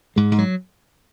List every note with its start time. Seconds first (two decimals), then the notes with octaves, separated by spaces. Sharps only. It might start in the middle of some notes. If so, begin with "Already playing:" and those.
0.16 G#2 G#3
0.32 G#2
0.38 F#3